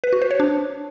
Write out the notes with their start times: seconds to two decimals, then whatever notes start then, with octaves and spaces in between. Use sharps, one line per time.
0.04 B4
0.13 F#4
0.22 C5
0.31 C#5
0.40 D4